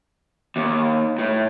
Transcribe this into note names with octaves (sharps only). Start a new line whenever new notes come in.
D#2
A2